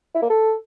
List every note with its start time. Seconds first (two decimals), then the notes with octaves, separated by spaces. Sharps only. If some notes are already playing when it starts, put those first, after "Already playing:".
0.15 E4
0.23 A#3
0.30 A4